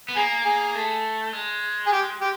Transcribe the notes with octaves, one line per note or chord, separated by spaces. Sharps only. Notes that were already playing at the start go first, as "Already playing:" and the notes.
B3
A#3 G#4
G#4
A3
G#3
G#4
G4
G4